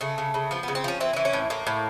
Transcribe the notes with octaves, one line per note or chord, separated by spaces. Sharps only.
C#3 A3
C#3
C#3
F3 B3
C#3 B3
C4
F3 C#4
E3 C4
C#4
E3
C#4
A2
A2 A#3
A2